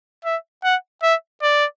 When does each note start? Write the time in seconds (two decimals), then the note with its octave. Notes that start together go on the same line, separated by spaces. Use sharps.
0.25 E5
0.64 F#5
1.03 E5
1.42 D5